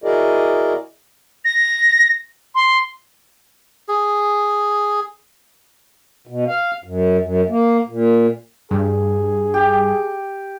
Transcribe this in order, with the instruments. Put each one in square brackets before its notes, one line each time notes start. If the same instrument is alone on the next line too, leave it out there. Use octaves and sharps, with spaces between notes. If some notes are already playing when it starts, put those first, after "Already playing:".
[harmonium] E4 F#4 G#4 A#4 D5 D#5
[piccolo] A#6
C6
[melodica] G#4
[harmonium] B2
F5
F#2
F#2
A#3
A#2
[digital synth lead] G2 [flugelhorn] G#4
[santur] G4